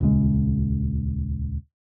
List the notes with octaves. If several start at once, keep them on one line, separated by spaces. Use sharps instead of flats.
D#1 C#2 C#3 G#3